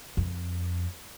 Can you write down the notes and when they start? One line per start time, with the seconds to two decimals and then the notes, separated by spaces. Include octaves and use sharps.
0.17 F2